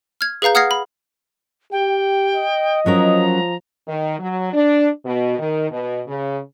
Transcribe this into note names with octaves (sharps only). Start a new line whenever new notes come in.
F6 G#6
G#4 B4 F5 A#5 G6
F#5 D#6 F6 G#6 A#6 C7
B5
G4 G5
D#5
F3 F#3 C#4 A#4 A#5
D#3
F#3
D4
B2
D#3
B2
C#3